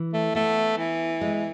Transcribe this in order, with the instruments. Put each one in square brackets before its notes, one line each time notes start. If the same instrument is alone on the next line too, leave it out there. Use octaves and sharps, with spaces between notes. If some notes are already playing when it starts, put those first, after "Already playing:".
Already playing: [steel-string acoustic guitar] E3
[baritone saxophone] A3
[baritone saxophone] A3 [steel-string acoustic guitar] B3
[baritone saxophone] E3
[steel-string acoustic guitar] G#3